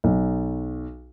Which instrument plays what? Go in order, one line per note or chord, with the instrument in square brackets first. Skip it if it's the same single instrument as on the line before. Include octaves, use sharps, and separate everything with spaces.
[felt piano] B1